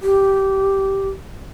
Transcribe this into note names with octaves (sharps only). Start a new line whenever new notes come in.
G4